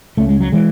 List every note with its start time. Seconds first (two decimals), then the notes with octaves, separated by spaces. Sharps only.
0.17 C#2 C#3 A3
0.29 G#3
0.40 F#3
0.52 E3 G#3